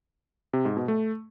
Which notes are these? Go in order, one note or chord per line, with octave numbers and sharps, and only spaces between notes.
C3
G#2
B2
A3